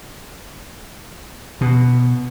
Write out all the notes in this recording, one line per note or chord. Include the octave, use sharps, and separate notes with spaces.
B2